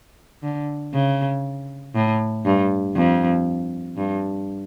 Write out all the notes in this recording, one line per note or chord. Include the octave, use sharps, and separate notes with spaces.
D3
C#3
A2
G2
F2
G2